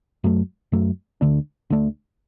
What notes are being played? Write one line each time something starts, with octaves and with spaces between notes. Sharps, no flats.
F#2 F#3 A3
F#2 F#3 A3
D2 D3 A3 D4
D2 D3 A3 D4